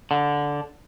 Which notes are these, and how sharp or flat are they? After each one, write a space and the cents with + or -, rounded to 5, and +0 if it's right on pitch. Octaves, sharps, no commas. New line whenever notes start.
D3 -10